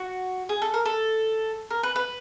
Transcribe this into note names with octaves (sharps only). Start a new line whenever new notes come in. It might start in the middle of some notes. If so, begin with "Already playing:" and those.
Already playing: F#4
G#4
A4
A#4
A4
A#4
B4
B4